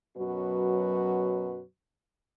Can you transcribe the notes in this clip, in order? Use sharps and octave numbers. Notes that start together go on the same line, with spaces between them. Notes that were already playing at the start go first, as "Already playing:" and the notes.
F#2 B2 F#3 F#4 B4